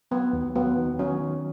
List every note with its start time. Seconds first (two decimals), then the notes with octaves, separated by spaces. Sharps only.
0.11 F#3 B3
0.33 D#2
0.56 F#3 B3
0.78 D#3
0.99 F#3 C#4
1.21 D#3